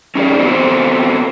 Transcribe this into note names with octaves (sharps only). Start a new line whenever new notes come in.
C#4 D#4 G4 G#4 D5
B3 C4 F#4 A4 C5